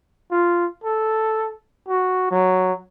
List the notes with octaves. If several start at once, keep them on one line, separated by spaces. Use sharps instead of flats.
F4
A4
F#4
F#3